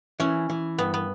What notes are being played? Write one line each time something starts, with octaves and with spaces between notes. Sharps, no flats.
E3 C#4
E3
G2 B3
B3